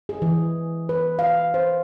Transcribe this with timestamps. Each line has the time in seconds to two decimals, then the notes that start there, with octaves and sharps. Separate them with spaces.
0.09 G#4
0.22 E3
0.89 B4
1.19 F5
1.54 C5